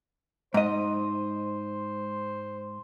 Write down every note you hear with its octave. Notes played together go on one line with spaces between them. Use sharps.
G#2 C5 D#5